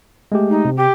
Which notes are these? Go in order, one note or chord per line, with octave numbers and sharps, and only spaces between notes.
G#3 A3 G4
D#4
C3
G4